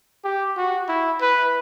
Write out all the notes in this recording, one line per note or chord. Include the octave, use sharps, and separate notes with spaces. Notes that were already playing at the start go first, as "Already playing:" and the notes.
G4
F#4
E4
B4